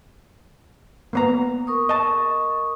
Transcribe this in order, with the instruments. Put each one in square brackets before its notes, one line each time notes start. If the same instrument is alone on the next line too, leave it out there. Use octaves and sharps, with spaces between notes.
[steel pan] A#3 B3 A#5
[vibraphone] A#4 C#6 D#6
[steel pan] D#5 A5